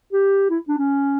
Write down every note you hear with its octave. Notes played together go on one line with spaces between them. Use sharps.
G4
E4
D4
C#4